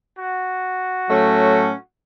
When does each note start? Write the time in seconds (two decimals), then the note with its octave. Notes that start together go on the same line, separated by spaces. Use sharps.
0.17 F#4
1.08 A2 F#3 A3 C#4